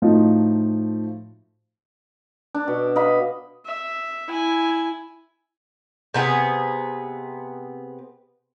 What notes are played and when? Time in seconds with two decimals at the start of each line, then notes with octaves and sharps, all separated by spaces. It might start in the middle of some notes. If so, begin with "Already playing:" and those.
0.02 A2 F3 A3 D#4 F4 F#4
2.55 D4
2.68 B2
2.96 D#5 F5 B5
3.65 E5
4.28 E4 G#5
6.14 C3 B3 G#4